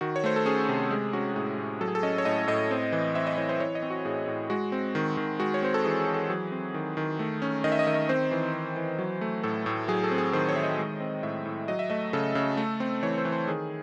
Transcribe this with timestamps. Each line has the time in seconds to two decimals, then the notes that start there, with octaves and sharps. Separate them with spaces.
0.01 D#3 F#4
0.16 C#5
0.24 A3 C5
0.36 A4
0.46 C#4 G#4
0.68 C3
0.91 G#3 G#4
1.13 C#4 F#4
1.31 F#4
1.36 A2 G#4
1.58 A2
1.81 F#3 A4
1.88 G#4
1.95 A4
2.03 C#4 D#5
2.18 C#5
2.25 A2 D#5
2.47 A2 D#5
2.71 C4
2.92 E3
3.15 C4 E5
3.27 D#5
3.38 E3 C#5
3.49 C5
3.60 E3 C#5
3.75 D#5
3.83 C4
3.90 F#4
4.05 A2 G#4
4.27 A2
4.50 G#3 F#4
4.72 C4
4.95 D#3
5.17 D#3
5.40 G#3 F#4
5.54 C#5
5.62 C4 C5
5.74 A4
5.84 E3 G#4
6.00 G#4
6.07 E3
6.14 A4
6.30 F#3 G#4
6.52 C4
6.74 D#3
6.97 D#3
7.19 A3
7.42 C#4
7.64 D#3 D#5
7.72 E5
7.79 D#5
7.87 D#3 E5
7.94 D#5
8.09 C4 C5
8.31 E3
8.54 C4
8.76 E3
8.98 F#3
9.21 A3
9.43 A2 A4
9.66 A2
9.88 F#3 G#4
10.04 A4
10.11 C4
10.18 G#4
10.33 D#3 C5
10.49 C#5
10.56 D#3 E5
10.63 D#5
10.78 G#3
11.00 C4
11.23 A2 E5
11.46 A2
11.68 F#3 D#5
11.79 E5
11.90 A3 D#5
12.13 C#3 A4
12.35 C#3
12.57 A3
12.80 C4
13.03 E3 C#5
13.18 C5
13.25 E3
13.32 C5
13.48 D#3 G#4